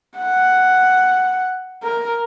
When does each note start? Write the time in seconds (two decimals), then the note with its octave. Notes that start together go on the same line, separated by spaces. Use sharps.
0.19 F#5
1.83 A#4